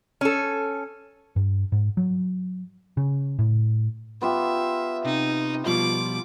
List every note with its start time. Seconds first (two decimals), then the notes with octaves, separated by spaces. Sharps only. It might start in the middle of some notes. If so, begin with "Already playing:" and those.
0.21 C#4 A4
1.36 G2
1.72 G#2
1.97 F#3
2.97 C#3
3.39 A2
4.21 B3 F4 G4 E5
5.05 C3 D#4
5.66 B2 F3 G3 F4 D6